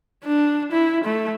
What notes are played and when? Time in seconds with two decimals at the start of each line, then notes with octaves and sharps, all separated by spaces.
0.24 D4
0.72 E4
1.05 A3